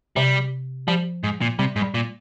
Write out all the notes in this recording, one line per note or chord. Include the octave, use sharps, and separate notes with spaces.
C3 G3
F3 G3
G#2
A#2
C3 G3
G#2
G3
A#2